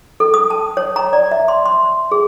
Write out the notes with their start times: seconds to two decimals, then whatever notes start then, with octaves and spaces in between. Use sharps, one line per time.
0.20 A4
0.34 D#6
0.50 A5
0.77 C#5
0.96 A#5
1.13 D5
1.31 E5
1.48 C6
1.66 C6
2.11 G#4